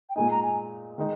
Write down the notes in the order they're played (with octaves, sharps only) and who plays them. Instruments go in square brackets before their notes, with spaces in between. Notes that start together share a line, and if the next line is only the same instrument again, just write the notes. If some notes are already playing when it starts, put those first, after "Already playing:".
[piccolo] G5
[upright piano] A#2 G#3 D#4 [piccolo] G#5
[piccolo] A#5
G#5
[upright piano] D#3 G#3 D#4